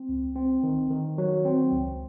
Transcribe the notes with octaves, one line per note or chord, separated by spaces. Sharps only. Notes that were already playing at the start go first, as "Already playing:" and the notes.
Already playing: C4
C#2
C4
D#3
D#3
F#3
C4
C#2